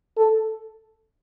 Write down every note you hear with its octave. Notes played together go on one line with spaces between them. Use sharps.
A4